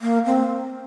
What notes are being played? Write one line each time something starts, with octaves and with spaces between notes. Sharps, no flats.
A#3
C4